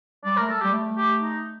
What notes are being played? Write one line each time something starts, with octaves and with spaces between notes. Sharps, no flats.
G3 D5
A#4
A3
A4
G3 G4
A3
G4
D#4